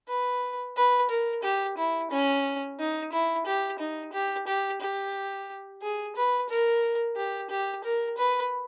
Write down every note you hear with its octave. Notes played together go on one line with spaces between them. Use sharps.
B4
B4
A#4
G4
E4
C#4
D#4
E4
G4
D#4
G4
G4
G4
G#4
B4
A#4
G4
G4
A#4
B4